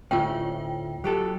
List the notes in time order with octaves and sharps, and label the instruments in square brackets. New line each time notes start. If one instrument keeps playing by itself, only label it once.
[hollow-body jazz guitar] D2 A2 C#4 [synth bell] F4 G5
[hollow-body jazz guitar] F#3 G4 A4